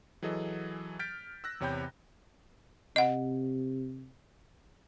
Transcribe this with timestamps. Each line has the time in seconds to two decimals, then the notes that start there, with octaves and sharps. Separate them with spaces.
0.22 E3 F#3 G#4 A4 D#5
0.99 F6 G6 A6 B6 D7
1.44 E6 F#6 A#6
1.60 E2 C3 C#5 G5 B5 G6
2.96 C3 D#5 F#5